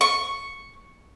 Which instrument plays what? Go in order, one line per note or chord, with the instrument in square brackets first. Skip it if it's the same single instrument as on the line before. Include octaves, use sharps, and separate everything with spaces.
[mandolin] C#6